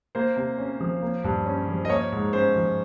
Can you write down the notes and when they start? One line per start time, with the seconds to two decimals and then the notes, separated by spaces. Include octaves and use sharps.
0.15 A#3 C5
0.36 C3
0.58 C#4
0.80 F3
1.02 A#3
1.24 G2
1.46 C#4
1.68 F3
1.85 D#5
1.89 A#3 C#5
2.12 G#2
2.33 C#4 C5
2.56 F3